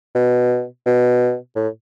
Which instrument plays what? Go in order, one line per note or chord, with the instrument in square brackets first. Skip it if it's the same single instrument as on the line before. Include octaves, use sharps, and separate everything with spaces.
[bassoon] B2
B2
A2